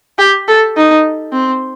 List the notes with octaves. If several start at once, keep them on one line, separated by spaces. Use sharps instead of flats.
G4
A4
D#4
C4